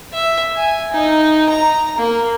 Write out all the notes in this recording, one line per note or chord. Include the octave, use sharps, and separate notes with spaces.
E5
G#5
D#4
A#5
A#3